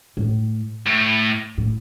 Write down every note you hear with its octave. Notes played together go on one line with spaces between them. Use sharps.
A2
A2
A2